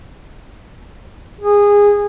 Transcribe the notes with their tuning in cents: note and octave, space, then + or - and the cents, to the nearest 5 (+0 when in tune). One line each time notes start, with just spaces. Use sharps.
G#4 -20